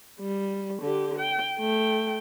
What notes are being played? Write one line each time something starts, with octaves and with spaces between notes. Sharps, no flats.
G3
D3 G4
G5
A3 G5